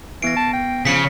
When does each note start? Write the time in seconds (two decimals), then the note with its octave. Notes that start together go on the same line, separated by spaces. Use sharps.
0.22 E3 B3 A#6 C7 D7
0.37 A5
0.53 G5
0.85 C#3 F3 B6 C#7